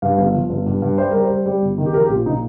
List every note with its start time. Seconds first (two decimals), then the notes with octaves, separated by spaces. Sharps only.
0.02 G2 F5
0.18 G1
0.34 F3
0.49 G1
0.66 G2
0.82 G2
0.98 G3 C5
1.11 G3 A#4
1.24 C5
1.30 G3
1.46 G3
1.62 G1
1.78 D#3
1.86 G4
1.94 F3 A#4
2.05 G4
2.10 A#1 F4
2.26 A#2 D#4